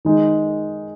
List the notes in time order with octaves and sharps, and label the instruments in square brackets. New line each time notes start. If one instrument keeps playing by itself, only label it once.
[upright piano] D#3 G#3 D#4